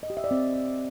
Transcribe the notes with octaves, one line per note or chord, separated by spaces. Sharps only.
D#5
G4
E5
D5
C4